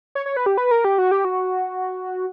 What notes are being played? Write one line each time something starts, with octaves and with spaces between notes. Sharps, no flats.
C#5
C#5
B4
G4
B4
A#4
G4
F#4
G4
F#4